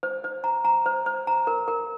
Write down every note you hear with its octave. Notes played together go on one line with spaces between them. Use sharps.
C5
C5
A#5
A#5
C5
C5
A#5
A#4
A#4